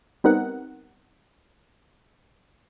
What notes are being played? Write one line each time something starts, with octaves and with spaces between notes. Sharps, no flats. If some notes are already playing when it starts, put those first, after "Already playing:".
G3 B3 C4 D#4 A#4 F#5